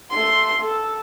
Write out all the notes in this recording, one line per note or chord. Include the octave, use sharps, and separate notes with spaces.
A3 C6
A4